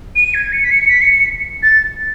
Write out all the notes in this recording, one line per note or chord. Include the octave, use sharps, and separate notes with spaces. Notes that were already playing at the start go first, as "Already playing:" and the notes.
D#7
G#6
C#7
B6
C#7
B6
C#7
C#7
A6